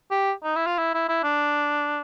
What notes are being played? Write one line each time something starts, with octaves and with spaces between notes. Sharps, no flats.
G4
D#4
E4
F4
E4
E4
E4
D4